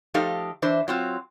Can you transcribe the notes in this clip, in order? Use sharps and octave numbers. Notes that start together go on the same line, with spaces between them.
F3 A3 D#4 G4 A4 F5
E3 D4 C5 E5
F#3 C4 F4